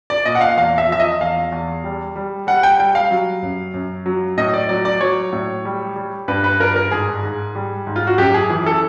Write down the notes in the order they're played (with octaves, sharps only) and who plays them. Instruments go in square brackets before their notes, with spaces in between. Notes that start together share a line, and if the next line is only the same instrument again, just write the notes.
[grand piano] D5
A#2 D#5
F#5
F5
E2 F5
E5
F3 E5
D#5
E2 F5
E2
G3
G3
G3 F#5
G5
G3 G5
F5
F#3
F#2
F#2
F#3
A2 D#5
D5
F#3 D5
D5
F#3 C#5
A2
G3
G3
G2 B4
B4
G2 A#4
A#4
G#2 G#4
G#2
G3
G#2
F4
F#4
F#2 G4
G#4
E3 G#4
A4